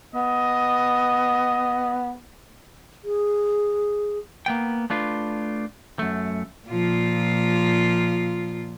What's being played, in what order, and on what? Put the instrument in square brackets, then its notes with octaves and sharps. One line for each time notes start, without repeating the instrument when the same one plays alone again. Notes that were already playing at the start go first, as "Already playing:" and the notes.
[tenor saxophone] B3 [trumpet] D#5
[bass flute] G#4
[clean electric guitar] A#3 B3 G5
A3 D4 F4 B4
F#2 A3
[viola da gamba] A#2 F3 F4